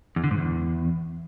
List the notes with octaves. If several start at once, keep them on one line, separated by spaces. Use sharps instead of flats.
E2
D3
G#2
E2